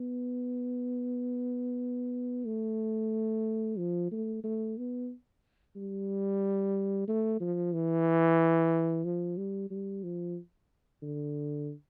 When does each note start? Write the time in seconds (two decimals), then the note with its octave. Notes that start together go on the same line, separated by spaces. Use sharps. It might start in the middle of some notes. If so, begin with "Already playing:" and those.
Already playing: B3
2.46 A3
3.78 F3
4.12 A3
4.44 A3
4.78 B3
5.76 G3
7.08 A3
7.41 F3
7.73 E3
9.04 F3
9.37 G3
9.71 G3
10.03 F3
11.02 D3